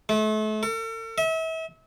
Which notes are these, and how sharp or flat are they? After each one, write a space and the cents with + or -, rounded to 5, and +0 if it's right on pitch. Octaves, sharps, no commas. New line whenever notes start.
A3 -35
A4 +45
E5 -35